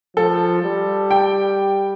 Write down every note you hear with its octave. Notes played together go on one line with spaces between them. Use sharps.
F3 A4
G3
G5